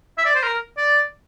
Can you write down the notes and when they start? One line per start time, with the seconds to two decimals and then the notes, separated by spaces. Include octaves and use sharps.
0.18 E5
0.25 D5
0.35 C5
0.43 A#4
0.77 D5